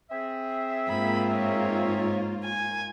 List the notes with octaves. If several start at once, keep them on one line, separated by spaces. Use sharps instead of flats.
C4 G#4 E5
G#2 A#3 F4 B5
C#5
G#5